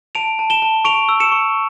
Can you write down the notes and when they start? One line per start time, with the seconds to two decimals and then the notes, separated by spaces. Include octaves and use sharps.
0.15 A5 D7 F7
0.39 A5
0.50 E7 G7
0.62 A5
0.85 C#6 D7 F7
1.09 E6
1.20 C#7 E7
1.32 C#6